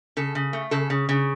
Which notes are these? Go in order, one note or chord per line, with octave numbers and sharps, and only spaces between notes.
C#3 A4
C#3
A3
C#3 A4
C#3
C#3